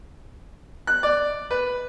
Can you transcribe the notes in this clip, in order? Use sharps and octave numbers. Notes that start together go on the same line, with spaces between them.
F#6
D5
B4